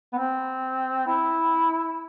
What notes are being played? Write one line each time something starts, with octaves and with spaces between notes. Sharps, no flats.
B3
C4
E4